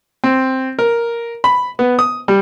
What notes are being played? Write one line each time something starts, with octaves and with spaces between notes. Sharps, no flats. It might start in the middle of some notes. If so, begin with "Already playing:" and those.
C4
A#4
B5
B3
D#6
G3